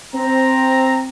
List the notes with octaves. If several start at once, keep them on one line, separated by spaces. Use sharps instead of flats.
C4 A#5